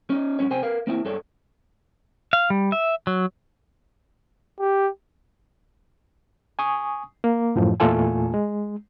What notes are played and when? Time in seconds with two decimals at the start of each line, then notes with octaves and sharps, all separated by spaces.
0.10 C#4 D#4
0.39 G2 C#4 C#5
0.51 C3 C5 G5 G#5
0.63 A#4 B4 F5
0.87 A#3 C4 E4
1.05 G2 A4 C#5 D5
2.33 F5
2.50 G3
2.72 E5
3.07 F#3
4.60 G4
6.59 G#5 C#6 D#6
7.24 A#3
7.56 F#2 A2 F3
7.80 E2 A#2 A3 F4 A4 G#5
8.34 G#3